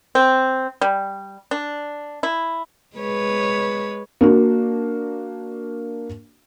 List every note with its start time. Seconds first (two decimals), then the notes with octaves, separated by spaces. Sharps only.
0.15 C4
0.81 G3
1.51 D4
2.23 E4
2.97 G#3 B4 C#5
4.21 A#3 D4 F#4